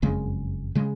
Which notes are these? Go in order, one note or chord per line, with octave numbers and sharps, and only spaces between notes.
F#1 F2 C#3 G#3
C#3 G#3